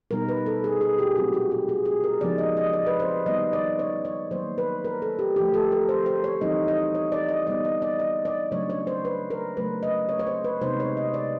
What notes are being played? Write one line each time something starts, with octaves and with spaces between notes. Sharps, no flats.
B2 G3 B3 D#4 A#4
B4
A4
G#4
G#4
G4
A#2 F#3 A3 C4 F#4
F#4
G4
G#4
G#4
A#4
C#3 F3 G#3 B3 D#4 D5
D#5
D#5
D5
B4
C5
D#3 G3 B3 D#4 D#5
D5
C#5
C#5
D#3 F#3 A#3 C5
B4
A#4
A4
G4
D3 F3 A3 G4
A4
A#4
C5
C5
C#5
E3 G3 C4 D#4 D#5
D#5
C#5
D5
D#5
D3 G3 B3 D#4 D5
D#5
D5
D#5
D5
C#3 F#3 A3 D4 C#5
C#5
C5
B4
A#4
C#3 F#3 A3 B4
D#5
C#5
C#5
C5
B4
C3 D#3 G#3 B3 D#4 C5
C#5
D#5
D5